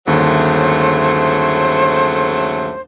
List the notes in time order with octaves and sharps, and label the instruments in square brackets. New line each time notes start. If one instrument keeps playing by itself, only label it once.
[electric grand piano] G1 D#2 [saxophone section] C#3 F#3 A3 [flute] C5